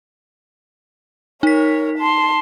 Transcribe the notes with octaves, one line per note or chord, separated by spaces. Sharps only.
D#4 A#4 C#5 B6
A5 C6